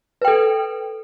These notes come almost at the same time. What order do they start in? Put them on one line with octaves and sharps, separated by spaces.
B4 G5 A4